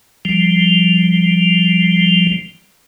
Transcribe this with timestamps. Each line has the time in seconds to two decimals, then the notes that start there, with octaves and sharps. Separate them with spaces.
0.25 F3 G3